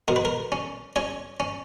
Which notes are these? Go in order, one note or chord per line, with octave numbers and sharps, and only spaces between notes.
B2 A#4
B4
A#4
C#4
C#4 C#5
C#4